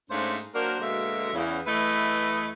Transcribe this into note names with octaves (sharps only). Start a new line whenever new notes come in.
G#2 A3 C#4 D4 C5 F5
F#3 A#3 D4 F#4 A#4 C5
B2 D3 G#3 A#3 F#4 E5
E2 C#3
E2 A3 E4 B4 D#5